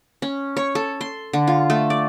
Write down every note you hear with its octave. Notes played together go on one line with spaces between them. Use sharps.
C#4
C#5
A4
C6
D3
F4
A3
D5